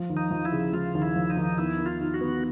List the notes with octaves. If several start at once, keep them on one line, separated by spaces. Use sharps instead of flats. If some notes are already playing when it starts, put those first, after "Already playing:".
Already playing: F3
D#2
D#4
F3
E4
C#3
F3 F4
D#2
E4
F3
D#4
D#2
B3 E4
D#3
F4
D#3
F#4
B3